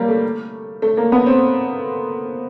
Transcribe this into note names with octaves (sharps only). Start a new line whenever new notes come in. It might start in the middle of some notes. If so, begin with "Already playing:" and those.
Already playing: G3 A#3
A3
A3
A#3
B3
C4